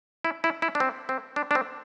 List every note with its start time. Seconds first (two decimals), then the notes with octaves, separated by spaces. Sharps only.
0.25 E4
0.44 E4
0.62 E4
0.75 D4
0.80 C4
1.09 C4
1.36 D4
1.51 D4
1.55 C4